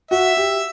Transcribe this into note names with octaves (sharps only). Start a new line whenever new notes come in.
F#4 E5
G4